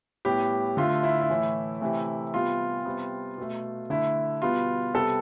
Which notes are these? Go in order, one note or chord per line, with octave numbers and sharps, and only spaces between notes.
A2 G3 B3 G4
D3 A3 F4
E4
E4
A2 E3 A3
C3 E3 A3
C3 G3 B3 F4
C3 G3 B3
B2 A3
D3 A3 E4
B2 G3 B3 F4
C3 G3 B3 A4